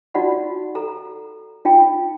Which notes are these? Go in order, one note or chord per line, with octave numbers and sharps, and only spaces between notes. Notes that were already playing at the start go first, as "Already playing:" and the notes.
D#4 F4 F#4 D5 F#5 B5
A4 A#5
D#4 F4 G5